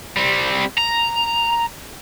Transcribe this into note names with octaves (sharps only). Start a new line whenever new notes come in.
G3 C4
A#5